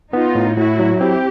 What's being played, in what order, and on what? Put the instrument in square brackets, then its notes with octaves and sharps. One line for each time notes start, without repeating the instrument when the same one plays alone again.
[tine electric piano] B3 [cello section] D#4 F4
[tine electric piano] A2
[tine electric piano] A2 [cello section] E4 F#4
[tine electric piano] F#3
[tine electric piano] C4 [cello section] G4